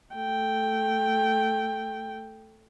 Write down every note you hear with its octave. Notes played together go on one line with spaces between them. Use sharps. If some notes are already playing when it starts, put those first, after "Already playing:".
A3 G5